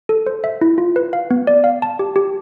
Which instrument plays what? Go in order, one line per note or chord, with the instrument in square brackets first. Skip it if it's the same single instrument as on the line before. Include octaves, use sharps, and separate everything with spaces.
[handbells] A4
C5
E5
E4
F4
B4
F5
B3
D5
F5
A5
G4
G4